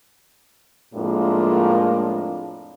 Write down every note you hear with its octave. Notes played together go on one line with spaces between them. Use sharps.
F2 A2 G#3 A#3 D4 F4